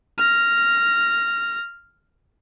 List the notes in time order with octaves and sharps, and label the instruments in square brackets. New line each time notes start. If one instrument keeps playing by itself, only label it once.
[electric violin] F6 A#6